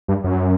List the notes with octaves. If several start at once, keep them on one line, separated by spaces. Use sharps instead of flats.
G2
F#2